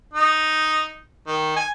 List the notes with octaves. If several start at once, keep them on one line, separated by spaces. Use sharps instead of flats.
D#4
D#3
G#5